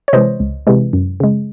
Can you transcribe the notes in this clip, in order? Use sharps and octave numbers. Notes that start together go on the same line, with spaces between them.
C#5
C3 E3 G#3 C5 D#5
C#2
C3 E3 G#3
F#2
C#3 G#3